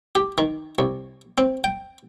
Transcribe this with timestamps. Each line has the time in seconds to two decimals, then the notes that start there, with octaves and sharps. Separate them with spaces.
0.15 G4
0.38 D#3
0.79 C2
1.38 C4
1.64 G5